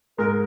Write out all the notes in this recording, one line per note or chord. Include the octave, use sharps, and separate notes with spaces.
G#2 G#3 A#4